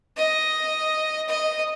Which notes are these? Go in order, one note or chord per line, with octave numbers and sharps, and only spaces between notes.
D#5
D#5